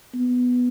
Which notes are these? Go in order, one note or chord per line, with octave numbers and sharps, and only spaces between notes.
B3